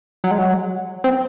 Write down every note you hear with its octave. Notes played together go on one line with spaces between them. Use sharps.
F#3
G#3
F#3
C4